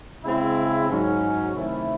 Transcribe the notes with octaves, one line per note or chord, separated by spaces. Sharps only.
C#3 G#3 C4 E4
G#2 F#3 C#4
C3 D#3 A3 C#4 E4